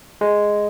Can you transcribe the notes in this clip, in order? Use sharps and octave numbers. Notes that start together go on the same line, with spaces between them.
G#3